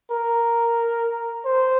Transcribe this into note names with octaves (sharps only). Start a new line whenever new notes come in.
A#4
C5